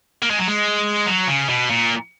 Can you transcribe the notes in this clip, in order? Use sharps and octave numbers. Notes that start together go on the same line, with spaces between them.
A#3
G#3
F#3
G#3
F#3
C#3
B2
A#2